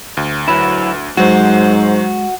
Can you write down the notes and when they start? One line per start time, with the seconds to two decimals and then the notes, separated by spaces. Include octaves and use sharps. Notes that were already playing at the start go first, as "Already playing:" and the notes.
0.17 D2
0.48 F#3 E4 B4
1.17 G#2 F#3 G#3 F#4 C5